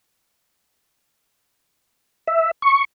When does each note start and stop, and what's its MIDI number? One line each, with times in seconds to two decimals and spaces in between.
2.27 2.51 76
2.62 2.84 85